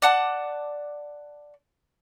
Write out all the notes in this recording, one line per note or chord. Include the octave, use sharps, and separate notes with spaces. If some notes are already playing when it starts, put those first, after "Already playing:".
D5 F#5 A5